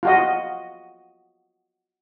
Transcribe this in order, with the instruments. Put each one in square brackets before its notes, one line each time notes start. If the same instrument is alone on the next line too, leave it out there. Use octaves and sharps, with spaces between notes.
[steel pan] F4 F#4 D#5